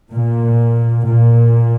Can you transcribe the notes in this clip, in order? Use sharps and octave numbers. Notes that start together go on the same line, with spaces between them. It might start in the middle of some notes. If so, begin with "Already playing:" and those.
A#2
A#2